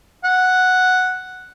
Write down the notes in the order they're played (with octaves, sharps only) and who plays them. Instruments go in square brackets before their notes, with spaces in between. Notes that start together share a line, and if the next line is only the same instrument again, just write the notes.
[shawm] F#5